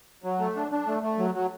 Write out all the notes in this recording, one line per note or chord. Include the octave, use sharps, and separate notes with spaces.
F#3
A3
D4
D4
A3
A3
F#3
F#3